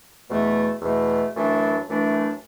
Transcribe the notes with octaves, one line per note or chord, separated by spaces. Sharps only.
E2 B2 A3
E2 B2 A3
F#2 E3 A3 D4
F#2 E3 A3 D4